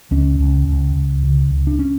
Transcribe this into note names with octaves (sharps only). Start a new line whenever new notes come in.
C#2 C#4
C#2
C#2
C#2
C#3
C#2
D4
C#4